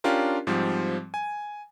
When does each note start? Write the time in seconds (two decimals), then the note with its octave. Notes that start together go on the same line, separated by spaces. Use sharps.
0.04 C#4 D4 F4 G4 A#4
0.47 G#2 F3 G3 C4
1.14 G#5